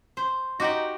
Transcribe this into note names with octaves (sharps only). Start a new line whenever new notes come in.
C5
D#4 F#4 G4 F#5 D6 A#6